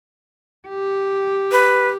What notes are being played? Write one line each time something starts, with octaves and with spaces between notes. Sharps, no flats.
G4
B4